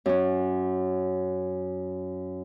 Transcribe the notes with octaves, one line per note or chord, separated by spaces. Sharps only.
F#2 C#4